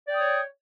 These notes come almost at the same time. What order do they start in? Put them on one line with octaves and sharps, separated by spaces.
D5 G5 D#6 C#5